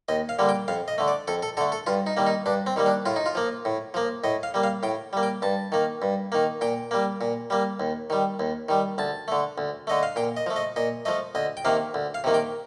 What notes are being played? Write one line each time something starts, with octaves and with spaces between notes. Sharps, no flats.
D#2 D#5
F5
D3 G3 A#3
G5
F2 F5
D#5
D3 A3
D5
F2 A4
A4
D3 A3 A4
A4
G2 F4
D#4
D#3 G3 A#3
D#4
G2 D4
C4
D#3 G3 A#3
D4
A2 F4
D#4
F4
F3 A#3
A2
F3 A#3
A2 D#5
F5
G3 A#3
F5
A2 G5
G3 A#3
G5
G2 A5
D#3 A#3
G2
D#3 A#3
A#2 G5
G3 A#3
A#2
G3 A#3
D#2
D#3 G3
D#2
D#3 G3
D2 A5
D3 A3
D2
D3 A3 D#5
F5
A#2 G5
D#5
F3 A3
D#5
A#2 D#5
F3 A3 D#5
D2 D#5
G5
C3 D#3 A#3 F5
D2
F5
C3 D#3 A#3
G5